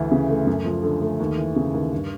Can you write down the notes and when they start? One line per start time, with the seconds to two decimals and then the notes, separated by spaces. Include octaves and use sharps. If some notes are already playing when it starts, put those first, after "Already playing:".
Already playing: D2 E3
0.12 C#3
0.30 A3
0.47 F#2
0.65 F3
0.83 D3
1.01 A3
1.20 D#2
1.38 E3
1.56 C#3
1.74 D#2
1.92 G2